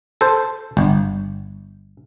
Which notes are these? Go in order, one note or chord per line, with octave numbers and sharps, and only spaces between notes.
A4 C5
G1